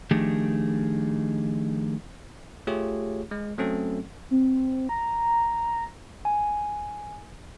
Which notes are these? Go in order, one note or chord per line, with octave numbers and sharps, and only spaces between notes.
D#3 F3 A3 D4 G4 G#4
A3 F4 G4 G#4 C#5
G#3
F#3 A3 C4 C#4 A4
C4
A#5
G#5